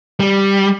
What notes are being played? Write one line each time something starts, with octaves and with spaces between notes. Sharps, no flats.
G3